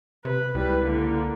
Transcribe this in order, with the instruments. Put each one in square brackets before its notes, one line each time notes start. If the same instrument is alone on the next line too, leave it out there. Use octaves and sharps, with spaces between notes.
[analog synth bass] C3 [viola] B4
[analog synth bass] C#2 [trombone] G3 [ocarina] E4 [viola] B4
[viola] D3 [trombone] A#3